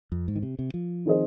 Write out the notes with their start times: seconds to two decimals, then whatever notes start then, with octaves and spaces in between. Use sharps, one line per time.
0.12 F2
0.28 G#2
0.36 D#3
0.43 C3
0.59 C3
0.74 F3
1.06 D#3 C4 G#4 C5 D#5